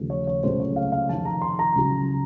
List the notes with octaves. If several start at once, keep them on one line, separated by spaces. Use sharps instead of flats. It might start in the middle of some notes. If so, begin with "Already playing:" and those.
Already playing: D#2 C#3 F3 A3
C#5
C#5
C#2 C3 F#3 A3 C5
C#5
F5
F5
F2 C3 D#3 A5
A#5
C6
A#5
C#2 C#3 F#3